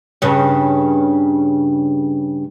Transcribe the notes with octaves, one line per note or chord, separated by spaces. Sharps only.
G2 C#3